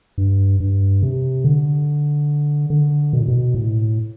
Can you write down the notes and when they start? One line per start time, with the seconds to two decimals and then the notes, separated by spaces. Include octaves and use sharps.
0.18 G2
0.60 G2
1.03 C3
1.44 D3
2.70 D3
3.13 B2
3.20 A2
3.28 B2
3.54 A2